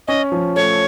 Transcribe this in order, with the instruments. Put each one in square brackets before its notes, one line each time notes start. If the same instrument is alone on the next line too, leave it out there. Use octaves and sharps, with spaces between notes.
[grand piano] C#4 [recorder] D#5
[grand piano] F3
[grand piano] A3 [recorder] C#5